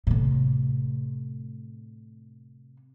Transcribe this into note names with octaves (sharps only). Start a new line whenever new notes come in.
A2 C3